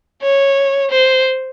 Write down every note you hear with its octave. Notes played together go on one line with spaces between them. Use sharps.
C#5
C5